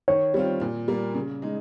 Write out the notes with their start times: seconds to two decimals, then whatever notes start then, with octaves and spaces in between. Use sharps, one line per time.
0.08 D#3 C#5
0.34 G3 C4 F4
0.61 A#2
0.88 G3 A#3
1.15 C#3
1.42 G#3 D#4